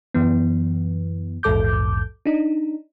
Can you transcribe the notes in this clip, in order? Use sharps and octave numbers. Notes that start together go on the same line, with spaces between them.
F#2 E3 B3
A#1 E2 G#2 A4 D6 G6
D4 D#4